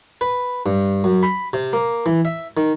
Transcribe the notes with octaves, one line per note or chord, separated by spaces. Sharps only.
B4
G2
F#2
B5
C3
A#3
E3
E5
D#3